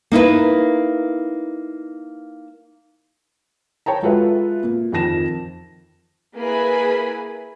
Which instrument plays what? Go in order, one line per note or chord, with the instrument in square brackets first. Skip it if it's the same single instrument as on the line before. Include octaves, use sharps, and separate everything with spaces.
[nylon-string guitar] A#3 D#4 E4 B4
[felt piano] C#5 G5 A5 A#5
G#3 F4 F#4 A4 B4 E5
A#2
F2 D#3 F3 A5 A#6 E7
[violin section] A#3 E4 G#4 B4 G#5 B5